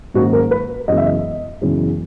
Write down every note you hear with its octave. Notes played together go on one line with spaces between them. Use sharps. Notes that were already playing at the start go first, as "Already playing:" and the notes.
G#2 D#3 F#3 A#3 C#4 F#4
A#4
B4
F#2 C#3 E3 G#3 B3 D#5
E5
D#5
F#2 C#3 E3 G#3 B3